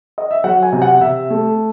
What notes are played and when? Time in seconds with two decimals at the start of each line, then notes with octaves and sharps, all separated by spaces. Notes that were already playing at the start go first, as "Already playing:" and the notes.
0.18 D#5
0.31 E5
0.44 F#3 F#5
0.63 G#5
0.72 C3
0.82 F#5
1.01 C3 E5
1.31 A3